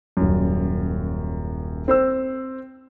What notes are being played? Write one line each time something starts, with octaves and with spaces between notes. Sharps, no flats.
D#1 F#2
C4 C5 E6